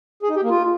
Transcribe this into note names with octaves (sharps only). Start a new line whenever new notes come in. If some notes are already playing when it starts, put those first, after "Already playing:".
G#4
D#4
G4
A#3
F4